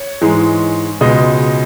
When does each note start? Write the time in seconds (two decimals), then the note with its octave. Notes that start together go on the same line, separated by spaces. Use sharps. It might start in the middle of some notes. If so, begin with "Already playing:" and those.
Already playing: C#5
0.21 G#2 E3 G#3
1.01 C#2 B2 G#3 D#5